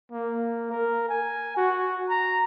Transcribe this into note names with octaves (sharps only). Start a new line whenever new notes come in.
A#3
A#4
G#5
F#4
A#5